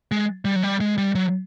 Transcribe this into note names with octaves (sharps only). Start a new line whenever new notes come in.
G#3
G3
F#3
G3
G#3
G3
F#3